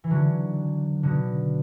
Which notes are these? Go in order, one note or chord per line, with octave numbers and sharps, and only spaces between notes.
E3
D3 F#3
B2 D3